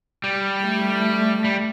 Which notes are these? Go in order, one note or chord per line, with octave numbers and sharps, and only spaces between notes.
G3
A3
G3